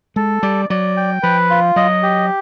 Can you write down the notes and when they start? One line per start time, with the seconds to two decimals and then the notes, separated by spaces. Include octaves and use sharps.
0.16 G#3 A4
0.43 G3 D5
0.70 F#3 D5
0.97 G5
1.23 F3 B4
1.50 F4
1.76 F#3 D#5
2.03 G4